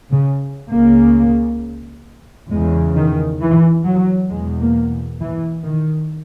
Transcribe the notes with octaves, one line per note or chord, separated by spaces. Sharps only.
C#3
C#2 C#3 A#3
E2 C#3 G#3
D#3
E3
F#3
E2 B2 G#3
A#3
E3
D#3